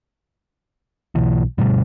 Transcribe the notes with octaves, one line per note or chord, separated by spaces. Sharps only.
B1 E3
G1 D2 B2 G3